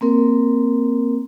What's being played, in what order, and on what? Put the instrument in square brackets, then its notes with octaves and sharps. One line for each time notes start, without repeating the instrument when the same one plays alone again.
[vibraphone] A#3 C4 A#4